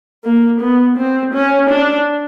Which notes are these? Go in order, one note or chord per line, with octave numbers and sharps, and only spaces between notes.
A#3
B3
C4
C#4
D4